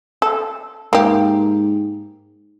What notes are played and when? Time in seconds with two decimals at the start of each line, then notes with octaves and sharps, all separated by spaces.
0.22 A4
0.93 G#2 A#3 G4